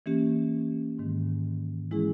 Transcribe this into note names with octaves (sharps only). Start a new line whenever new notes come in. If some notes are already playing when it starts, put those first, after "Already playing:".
E3 A#3 C#4 G4
G#2 D#3 G#3
E3 G#3 C#4 E4 G#4